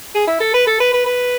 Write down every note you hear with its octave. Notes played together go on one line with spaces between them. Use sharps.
G#4
E4
A4
B4
A4
B4
B4
B4